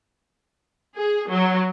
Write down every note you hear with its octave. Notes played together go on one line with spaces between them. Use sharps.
G#4
F#3